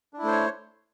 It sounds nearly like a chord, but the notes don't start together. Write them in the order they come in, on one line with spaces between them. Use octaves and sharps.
D4 E4 A3 C5 C#5